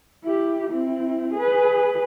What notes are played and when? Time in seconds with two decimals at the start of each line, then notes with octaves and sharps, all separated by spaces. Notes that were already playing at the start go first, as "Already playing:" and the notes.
0.24 E4 G4
0.71 C4 E4
1.34 G#4 B4